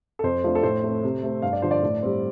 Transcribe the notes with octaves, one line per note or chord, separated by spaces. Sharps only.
A4
F2 C5
F3 A3 D4
A4
A2 C5
A3 C4
C3
A3 C4
G2 F5
D5
D3 F3 C5
D5
A2
G3 C4